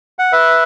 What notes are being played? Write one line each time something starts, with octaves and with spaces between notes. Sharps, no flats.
F#5
B4 E5